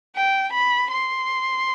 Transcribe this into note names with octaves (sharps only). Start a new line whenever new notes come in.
G5
B5
C6